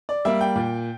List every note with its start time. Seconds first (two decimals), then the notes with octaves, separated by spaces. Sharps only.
0.09 D5
0.25 G3 A#3 E5
0.41 G5
0.56 A#2